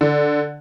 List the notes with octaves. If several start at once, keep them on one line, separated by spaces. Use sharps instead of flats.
D3